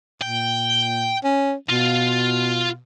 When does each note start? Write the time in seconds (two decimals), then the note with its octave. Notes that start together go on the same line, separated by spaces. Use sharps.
0.22 A#2 G5
1.23 C#4
1.70 B2 F4